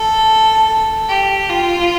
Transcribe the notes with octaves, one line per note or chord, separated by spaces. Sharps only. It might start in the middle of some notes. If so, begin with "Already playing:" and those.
Already playing: A4
G4
F4